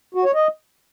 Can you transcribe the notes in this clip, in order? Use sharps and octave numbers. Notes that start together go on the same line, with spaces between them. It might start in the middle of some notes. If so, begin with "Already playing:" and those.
F#4
C#5
D#5